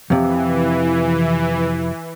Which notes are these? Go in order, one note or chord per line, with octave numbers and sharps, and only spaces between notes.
F2 C3 E3